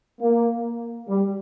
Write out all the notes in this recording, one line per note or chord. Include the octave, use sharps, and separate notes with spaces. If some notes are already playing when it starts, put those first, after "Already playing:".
A#3
G3